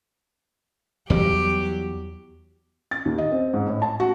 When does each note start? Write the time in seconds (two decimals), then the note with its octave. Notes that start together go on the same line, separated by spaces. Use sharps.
1.10 E2 F#3 G3 G4
2.91 A6
3.05 D#2
3.18 D#5
3.32 C4
3.54 G#2
3.67 A2
3.82 A5
4.00 F#4